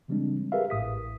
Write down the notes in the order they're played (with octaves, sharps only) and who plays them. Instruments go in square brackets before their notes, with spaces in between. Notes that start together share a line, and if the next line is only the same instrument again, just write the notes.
[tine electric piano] C#3 E3 G3 G#3 C4 D4
G4 G#4 A#4 B4 E5 F5
A1 A2 D#6 B6